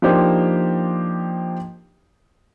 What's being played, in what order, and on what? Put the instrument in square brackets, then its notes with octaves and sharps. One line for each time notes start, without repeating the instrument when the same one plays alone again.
[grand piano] F3 A#3 D4 D#4 G4 C5